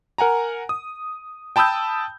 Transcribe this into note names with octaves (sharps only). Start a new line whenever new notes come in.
A#4 F#5 G#5 A#5
D#6
G5 A5 B5 D#6 E6 G6